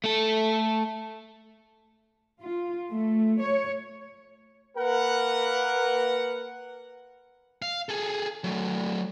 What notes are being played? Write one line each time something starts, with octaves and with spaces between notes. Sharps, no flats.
A3 A4
F4
A3
C#5
A#3 A#4 B4 F#5
F5
G#4 A4
F#3 A3